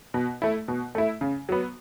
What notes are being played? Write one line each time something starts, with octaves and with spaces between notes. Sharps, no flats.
B2
A3 E4
B2
A3 E4
C#3
F#3 B3